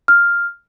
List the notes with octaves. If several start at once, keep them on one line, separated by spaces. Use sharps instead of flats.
F6